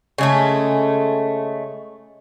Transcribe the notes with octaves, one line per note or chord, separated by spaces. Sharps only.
C#3 G#3 A3